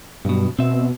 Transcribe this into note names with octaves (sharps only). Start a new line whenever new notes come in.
B1 G2 B2
B2 C4 E5